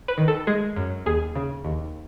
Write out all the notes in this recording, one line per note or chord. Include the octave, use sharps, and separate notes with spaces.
B4
D#3
A4
G#3 G#4
F#2
D#2 G#4
C#3
D#2